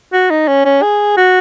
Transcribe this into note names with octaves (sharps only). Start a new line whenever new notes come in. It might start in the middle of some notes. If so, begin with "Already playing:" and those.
F#4
D#4
C#4
C#4
G#4
F#4